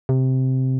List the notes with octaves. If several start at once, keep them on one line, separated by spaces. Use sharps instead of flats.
C3